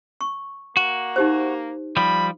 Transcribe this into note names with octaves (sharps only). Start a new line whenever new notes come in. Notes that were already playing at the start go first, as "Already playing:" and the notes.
C#6
A#3 F#4
D#4 G4 C5
F3 G3 B5